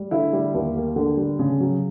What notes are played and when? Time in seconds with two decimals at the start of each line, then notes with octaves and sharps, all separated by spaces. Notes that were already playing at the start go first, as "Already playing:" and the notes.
Already playing: G3
0.11 D3 E4
0.33 G3
0.54 D#2
0.75 A#3
0.96 D3
1.17 G3
1.39 C#3
1.60 F#3